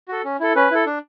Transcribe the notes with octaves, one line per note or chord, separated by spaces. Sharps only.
F#4 A4
C#4
E4 A4
C#4 B4
E4 A4
D4